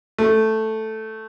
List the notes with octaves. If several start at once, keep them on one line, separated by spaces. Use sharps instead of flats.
A3